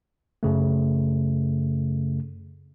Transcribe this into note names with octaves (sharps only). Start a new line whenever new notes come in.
F#2 C#3 A3